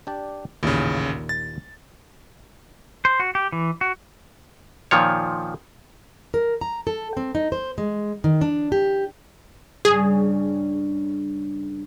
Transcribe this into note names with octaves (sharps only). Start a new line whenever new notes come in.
D4 G4 D5
A1 D#2 A#2 C#3 E4
A6
C5
F#4
G4
E3
F#4
A#2 D#3 F3 C#5
A#4
A#5
A4
C4
D#4
C5
G#3
D#3
D4
G4
G2 C#3 G3 G#4